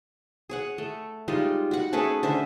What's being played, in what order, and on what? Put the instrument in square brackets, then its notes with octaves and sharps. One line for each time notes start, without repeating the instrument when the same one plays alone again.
[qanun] G#4 C#5 F#5
A3
G3 G#3 D#4 F4
F#4 F#5
A3 C#4 G#4 B4
D3 C#4 C5 E5